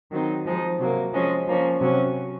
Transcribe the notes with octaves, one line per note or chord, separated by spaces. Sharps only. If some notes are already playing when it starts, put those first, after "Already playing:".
D#3 F#3 C4 D#4
F3 G#3 D#4
C3 F#3 A#3
F3 G#3 C#4
F3 A#3 C#4
C3 F#3 C#4